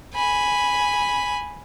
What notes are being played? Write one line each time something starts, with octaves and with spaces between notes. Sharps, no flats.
G#5 B5